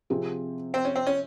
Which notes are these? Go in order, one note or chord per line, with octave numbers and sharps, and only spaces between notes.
C3 F3 C4 F4 G#4
C4
C#4
C4
C#4